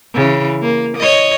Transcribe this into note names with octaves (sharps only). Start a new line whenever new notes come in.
C#3 E3
A#3
C#5 D#5